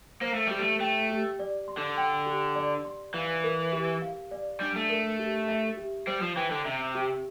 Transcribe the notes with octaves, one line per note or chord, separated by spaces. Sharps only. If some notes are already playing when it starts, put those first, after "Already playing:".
A#3 C5
A3
G3 G4
A3
A3 G5
G4
D5
C6
D3
G5
G4
D5
C6
E3 F5
A#4
G4
F5
D5
G3 D4
A3
A#4
G4
E5
G4
G3 C5
F3
E3 G5
D3
C3 E5
G4